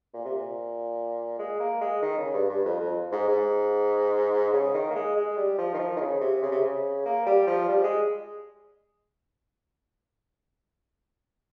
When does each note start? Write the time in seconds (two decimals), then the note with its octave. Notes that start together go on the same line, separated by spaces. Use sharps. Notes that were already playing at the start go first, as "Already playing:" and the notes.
0.13 A#2
0.25 C3
0.36 A#2
1.39 G#3
1.60 A#3
1.81 G#3
2.02 D#3
2.18 C#3
2.33 G2
2.49 G2
2.65 F2
2.80 F2
3.12 G#2
3.28 G#2
4.53 C#3
4.74 D#3
4.91 A#3
4.95 G#3
5.16 G#3
5.37 G3
5.58 F3
5.74 D#3
5.79 F3
5.96 D#3
6.00 C#3
6.21 C3
6.42 C#3
6.51 C3
6.61 C#3
7.05 A#3
7.26 G3
7.47 F3
7.68 G3
7.83 G#3